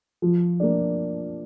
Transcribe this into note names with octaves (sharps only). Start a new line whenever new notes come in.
F3
A#3 D4